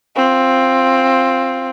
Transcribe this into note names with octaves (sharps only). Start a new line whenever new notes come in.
C4 F4